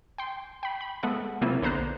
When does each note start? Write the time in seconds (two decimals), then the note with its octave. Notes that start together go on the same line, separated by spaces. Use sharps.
0.18 G5 C6
0.63 G5 B5
0.81 B5
1.03 G#3 B3 A4 E5 F#5
1.41 C3 F#3 A#3 C4 E4 F4
1.62 B1 D3 B3 C5 A#5 F#6